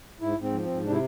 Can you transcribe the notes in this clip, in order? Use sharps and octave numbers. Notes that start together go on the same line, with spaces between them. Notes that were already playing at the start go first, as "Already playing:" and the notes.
G#2 E4
G#2
C4
F3
G#2 C4
C3 D4
E4